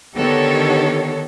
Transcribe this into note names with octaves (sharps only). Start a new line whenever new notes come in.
D3 D#3 B3 G4 A4 C#5